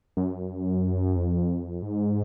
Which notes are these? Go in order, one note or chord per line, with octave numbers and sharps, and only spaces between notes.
F#2
F2
G#2